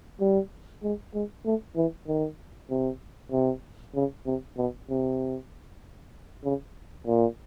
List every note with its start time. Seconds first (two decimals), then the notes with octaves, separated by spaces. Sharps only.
0.20 G3
0.83 G#3
1.14 G#3
1.45 A3
1.76 E3
2.07 D#3
2.70 C3
3.32 C3
3.95 C#3
4.26 C3
4.57 B2
4.89 C3
6.45 C#3
7.07 A#2